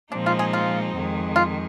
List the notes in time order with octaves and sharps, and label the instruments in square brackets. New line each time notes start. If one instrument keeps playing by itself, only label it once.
[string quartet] A#2 F3 G#3 C4 D#4 [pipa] D4
[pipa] F4
G#4
F4
[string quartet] F2 D#3 G#3
[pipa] F4